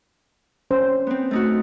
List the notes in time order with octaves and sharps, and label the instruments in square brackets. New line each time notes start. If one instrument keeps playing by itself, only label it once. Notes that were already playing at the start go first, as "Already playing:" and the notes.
[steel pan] C#4 C5
[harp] B3 C4
A3 D#4 F#4